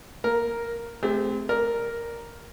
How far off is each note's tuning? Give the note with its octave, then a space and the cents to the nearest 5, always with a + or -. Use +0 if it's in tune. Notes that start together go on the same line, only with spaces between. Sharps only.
A#3 +10 A#4 +0
A3 -30 C4 -20 G4 +45
A#4 +0 D5 +0